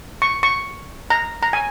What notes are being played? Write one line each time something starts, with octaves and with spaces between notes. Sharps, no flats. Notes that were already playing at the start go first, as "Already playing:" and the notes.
C#6
C#6
A#5
A#5
G#5